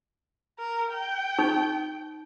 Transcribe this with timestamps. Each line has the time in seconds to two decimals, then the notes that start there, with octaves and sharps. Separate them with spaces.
0.58 A#4
0.92 G5
1.39 D#4